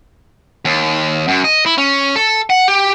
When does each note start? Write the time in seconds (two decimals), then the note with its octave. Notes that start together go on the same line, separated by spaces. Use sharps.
0.65 D#2
1.28 F#2
1.44 D#5
1.66 E4
1.78 C#4
2.16 A4
2.50 F#5
2.68 G4